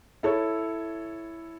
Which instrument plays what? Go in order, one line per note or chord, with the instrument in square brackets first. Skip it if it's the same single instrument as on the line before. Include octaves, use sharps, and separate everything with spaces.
[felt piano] E4 A4 C#5